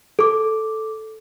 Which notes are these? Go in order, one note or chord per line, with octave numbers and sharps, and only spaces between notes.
A4 D6